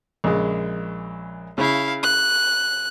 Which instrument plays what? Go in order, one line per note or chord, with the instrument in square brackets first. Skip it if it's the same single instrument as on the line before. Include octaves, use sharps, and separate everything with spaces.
[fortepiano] A#1 C#3 G#3
[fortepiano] C#3 [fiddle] E4 F5
[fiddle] F#6